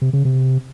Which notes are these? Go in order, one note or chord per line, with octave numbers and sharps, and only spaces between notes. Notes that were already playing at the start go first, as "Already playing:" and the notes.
C3
C#3
C3